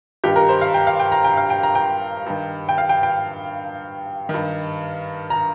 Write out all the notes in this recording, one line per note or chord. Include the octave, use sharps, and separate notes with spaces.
G2 D#3 G4
A#4
C5
F5
G5
F5
G5
A#5
G5
F5
G5
A#5
G5
G2 D#3
G5
F5
G5
G5
G2 D#3
A#5